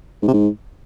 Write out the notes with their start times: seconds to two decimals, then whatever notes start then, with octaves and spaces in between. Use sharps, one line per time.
0.22 G#2
0.28 C3
0.33 G#2